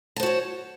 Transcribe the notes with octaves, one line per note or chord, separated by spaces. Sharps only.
F#4 C5 C#5 A5